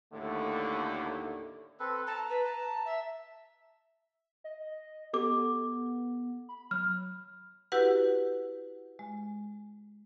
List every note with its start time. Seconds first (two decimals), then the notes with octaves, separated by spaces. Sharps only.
0.13 D#2 A2 D3 A3
1.80 C4 A4 B4
2.07 A5 A#5
2.29 B4
2.44 A5
2.85 E5
4.44 D#5
5.13 B3 G4 A4 D6
6.49 B5
6.71 F#3 F6
7.72 E4 F#4 G4 B4 F#5
8.99 G#3